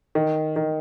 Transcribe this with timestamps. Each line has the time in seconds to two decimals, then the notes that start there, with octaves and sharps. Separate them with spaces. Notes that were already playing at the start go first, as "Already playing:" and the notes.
0.15 D#3
0.56 D#3